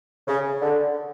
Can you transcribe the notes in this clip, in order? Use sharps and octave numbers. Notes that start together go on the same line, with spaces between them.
C#3
D3